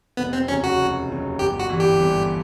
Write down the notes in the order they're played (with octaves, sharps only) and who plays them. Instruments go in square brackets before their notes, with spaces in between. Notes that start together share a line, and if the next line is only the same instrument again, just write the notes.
[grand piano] F1 [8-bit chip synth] B3
[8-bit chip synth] C4
[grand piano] D#2 C#3 F#3 [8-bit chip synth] C#4
[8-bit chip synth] F#4
[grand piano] F1
D#2 C#3 F#3
[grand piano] G1 [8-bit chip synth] G4
[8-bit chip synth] F#4
[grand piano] G2 E3
[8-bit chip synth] G4
[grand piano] G1